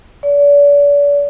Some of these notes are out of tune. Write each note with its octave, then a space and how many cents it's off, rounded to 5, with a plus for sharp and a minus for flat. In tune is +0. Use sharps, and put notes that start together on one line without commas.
D5 -40